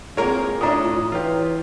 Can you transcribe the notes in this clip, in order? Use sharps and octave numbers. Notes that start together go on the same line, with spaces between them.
A#3 C4 F4 G#4 A#4 C#5
A2 C#4 D4 E5 A#5 D#6
E3 F4 G4 C#5